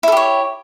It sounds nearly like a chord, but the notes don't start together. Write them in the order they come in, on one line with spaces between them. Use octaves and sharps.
E4 A4 G4 C#5